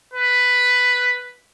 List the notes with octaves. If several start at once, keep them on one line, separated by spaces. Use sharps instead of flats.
B4